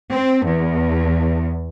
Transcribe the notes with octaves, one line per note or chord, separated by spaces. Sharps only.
C4
E2